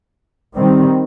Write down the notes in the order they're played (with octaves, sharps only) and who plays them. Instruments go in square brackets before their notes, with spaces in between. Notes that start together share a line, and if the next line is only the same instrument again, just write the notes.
[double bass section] D#3 G3 C4